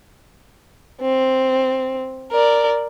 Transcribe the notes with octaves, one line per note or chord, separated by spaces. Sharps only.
C4
A#4 D5